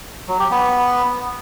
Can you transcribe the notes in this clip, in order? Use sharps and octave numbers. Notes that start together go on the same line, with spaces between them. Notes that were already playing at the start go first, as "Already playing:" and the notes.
F#3
G4
B3